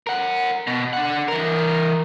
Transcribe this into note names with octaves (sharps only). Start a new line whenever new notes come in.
A#4 F#5
B2
D4 F#5
E3 A#4